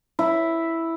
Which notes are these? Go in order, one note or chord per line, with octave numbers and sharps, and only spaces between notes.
E4